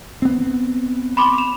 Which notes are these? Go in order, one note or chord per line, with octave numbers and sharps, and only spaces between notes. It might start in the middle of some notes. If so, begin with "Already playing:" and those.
B3 C4
B5 C6 D6
E7 F7